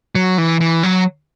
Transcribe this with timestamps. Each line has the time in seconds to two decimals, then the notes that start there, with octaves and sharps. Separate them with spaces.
0.15 F#3
0.38 E3
0.61 E3
0.83 F#3